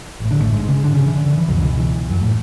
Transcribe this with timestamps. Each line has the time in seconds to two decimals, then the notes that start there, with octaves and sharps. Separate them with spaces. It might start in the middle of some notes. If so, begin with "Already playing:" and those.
0.20 A1 A2
0.31 D3 D4
0.41 A2 A3
0.52 G#2 G#3
0.68 C#3 C#4
0.84 D3 D4
0.95 C#3 C#4
1.05 E3
1.16 D3
1.26 D3
1.38 E3
1.48 C#2 F#2 B2 F#3
1.58 D3
1.68 E3
1.79 E3
2.10 F#2 F#3
2.22 A2 A3